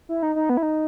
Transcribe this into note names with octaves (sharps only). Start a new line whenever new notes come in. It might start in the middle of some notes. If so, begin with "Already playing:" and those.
E4
D#4
D#4
B3
E4
D#4